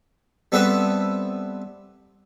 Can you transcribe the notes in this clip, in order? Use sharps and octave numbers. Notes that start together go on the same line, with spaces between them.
G3 B3 C4 A4 B4 E5